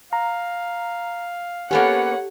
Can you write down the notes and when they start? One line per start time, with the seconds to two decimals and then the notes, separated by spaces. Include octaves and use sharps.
0.13 F5 A#5
1.71 A#3 B3 C#4 G4 A4 C#5 F#5